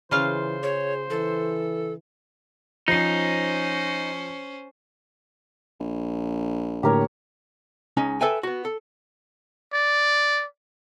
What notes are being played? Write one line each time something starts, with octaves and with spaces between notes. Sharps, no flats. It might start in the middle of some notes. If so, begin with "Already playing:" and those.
C#3 E3 F4 C5 F5
G#4 C#5
E3 A4
F3 C#4 D#4 C5 C7
A#1
A2 D3 A#3 G4 A#4 C#5
C#2 C#4 D#4
A4 B4 E5 G5 G#5
B3 F#4
A4
D5